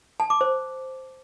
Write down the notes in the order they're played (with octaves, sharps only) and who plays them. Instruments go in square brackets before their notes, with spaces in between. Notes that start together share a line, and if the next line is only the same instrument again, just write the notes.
[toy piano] A5
D6
C5